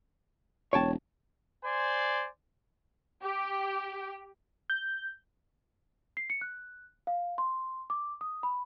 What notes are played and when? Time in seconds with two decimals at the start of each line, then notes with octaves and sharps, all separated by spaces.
0.73 E1 C#5 G5 A5
1.64 C5 D5 G#5 C6
3.24 G4
4.70 G6
6.17 C7
6.30 C#7
6.41 F#6
7.07 F5
7.38 C6
7.90 D6
8.21 D#6
8.43 B5